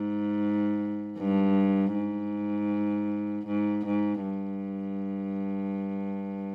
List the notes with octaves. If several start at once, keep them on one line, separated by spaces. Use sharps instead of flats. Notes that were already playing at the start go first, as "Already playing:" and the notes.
Already playing: G#2
G2
G#2
G#2
G#2
G2